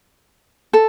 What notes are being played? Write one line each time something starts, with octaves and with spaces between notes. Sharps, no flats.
A4